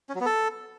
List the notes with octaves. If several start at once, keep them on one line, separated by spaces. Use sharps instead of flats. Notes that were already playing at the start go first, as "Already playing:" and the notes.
C#4
F#3
B3
A4